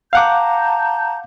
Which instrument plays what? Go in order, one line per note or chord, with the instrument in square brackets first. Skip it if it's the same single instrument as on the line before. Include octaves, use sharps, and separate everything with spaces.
[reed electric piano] F5 F#5 D6 [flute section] A5 A#5 G6